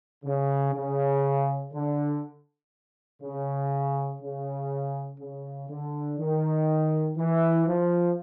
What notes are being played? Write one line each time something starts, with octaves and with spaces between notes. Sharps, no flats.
C#3
C#3
D3
C#3
C#3
C#3
D3
D#3
E3
F3